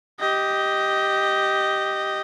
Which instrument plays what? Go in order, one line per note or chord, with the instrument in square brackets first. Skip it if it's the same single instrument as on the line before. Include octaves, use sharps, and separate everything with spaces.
[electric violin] G4 D#5